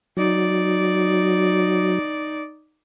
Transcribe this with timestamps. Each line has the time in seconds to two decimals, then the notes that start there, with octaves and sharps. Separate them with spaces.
0.17 F#3 D#4 D5